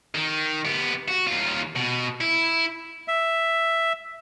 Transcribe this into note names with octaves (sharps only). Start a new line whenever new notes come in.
D#3
B3 G4
F#4
D#2 F4
B2
E4
E5